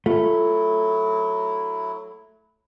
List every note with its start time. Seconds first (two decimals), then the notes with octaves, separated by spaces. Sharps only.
0.06 F#3 A3 E4 F4